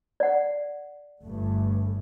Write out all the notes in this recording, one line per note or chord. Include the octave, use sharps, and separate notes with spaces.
D5 F#5
G1 G2 A3